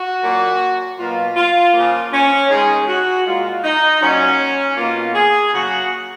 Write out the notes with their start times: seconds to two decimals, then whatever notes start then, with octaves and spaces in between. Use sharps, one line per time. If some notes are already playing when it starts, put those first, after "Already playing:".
Already playing: F#4
0.23 A#2 F#3 A#3
0.99 B2 F#3 A#3 F4
1.36 F4
1.74 C#3 F3 A#3 F4
2.12 C#4
2.50 D#3 G#3 G#4
2.88 F#4
3.26 A#2 G#3 F4
3.63 D#4
4.02 A#2 F#3 A#3 C#4
4.77 B2 A#3 F4
5.15 G#4
5.53 C#3 F#3 A#3 F#4